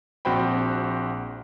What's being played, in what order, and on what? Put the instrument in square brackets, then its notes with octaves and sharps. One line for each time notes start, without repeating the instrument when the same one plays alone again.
[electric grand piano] A#1 C4 F#4 C5 G5 B5